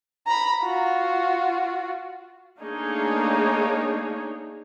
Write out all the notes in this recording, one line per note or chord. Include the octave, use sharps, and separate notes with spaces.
A#5 B5
F4 F#4
A3 A#3 D4 D#4 G#4 C#5